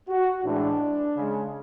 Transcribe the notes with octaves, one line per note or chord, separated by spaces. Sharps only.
F#4
A2 E3 G#3 D4
C#3 G#3